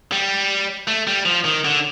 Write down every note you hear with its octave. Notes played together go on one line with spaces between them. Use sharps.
G3
A3
G3
F3
D#3
D3